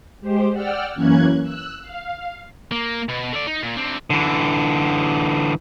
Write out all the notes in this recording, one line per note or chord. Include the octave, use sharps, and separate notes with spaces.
G#3 G4 C5
D5 F#5 G5 E6 F6
F#2 E3 A#3 C#4 F#6 G#6
E6 F#6
F5
A#3
B2
A3 D5
D#4
A#2
D3 C4
D3 E3